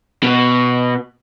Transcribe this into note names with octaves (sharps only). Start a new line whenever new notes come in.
B2